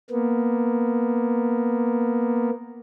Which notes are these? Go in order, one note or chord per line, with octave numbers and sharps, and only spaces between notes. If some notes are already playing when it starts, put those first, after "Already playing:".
A#3 B3